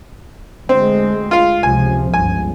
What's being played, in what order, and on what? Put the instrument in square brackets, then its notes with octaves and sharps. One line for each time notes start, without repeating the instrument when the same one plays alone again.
[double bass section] D2 G#3 [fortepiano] C4
[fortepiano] F4 F5
[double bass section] C#2 C3 F3 [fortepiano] G#5
[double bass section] G1 C#2 [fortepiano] G#5